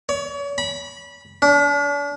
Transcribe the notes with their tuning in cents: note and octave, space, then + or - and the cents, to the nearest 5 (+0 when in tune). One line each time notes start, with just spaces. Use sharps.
C#5 +35
B5 -25
D4 -40